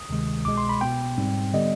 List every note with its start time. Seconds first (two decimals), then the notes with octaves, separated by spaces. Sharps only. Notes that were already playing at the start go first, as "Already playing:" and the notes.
Already playing: D#6
0.09 D2 C3 D#3 G#3
0.45 C2 B2 G#3 D6
0.57 C6
0.69 B5
0.81 B2 B3 G5
1.18 G#2 G3 C4
1.53 D3 G3 B3 D#5